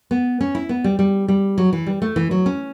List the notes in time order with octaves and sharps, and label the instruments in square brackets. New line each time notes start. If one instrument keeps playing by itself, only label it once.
[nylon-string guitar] B3
C#4
E4
B3
G3
G3
G3
F#3
E3
G3
A3
E3
F#3
C#4